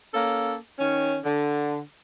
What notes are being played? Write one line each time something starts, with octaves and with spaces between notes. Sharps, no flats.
A#3 C#4 A4
D#3 C#4
D3